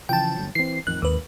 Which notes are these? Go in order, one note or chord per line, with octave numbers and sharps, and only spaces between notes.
C#3 E3 F3 G5 A5
G1 D2 F#3
E3 C4 C7
A1 F2 D#3 F#6
G#1 D#2 B4